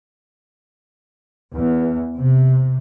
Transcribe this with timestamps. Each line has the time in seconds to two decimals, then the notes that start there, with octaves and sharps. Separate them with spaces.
1.55 E2
2.19 C3